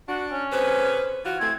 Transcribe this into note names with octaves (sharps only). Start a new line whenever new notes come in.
D4 F#4
C#4
C3 G#4 B4 C5
E3 F4 F#4
A2 E3 A3 C4 G#6